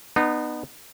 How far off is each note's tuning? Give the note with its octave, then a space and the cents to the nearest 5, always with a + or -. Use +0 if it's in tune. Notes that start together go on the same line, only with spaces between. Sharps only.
B3 +0 D#4 -35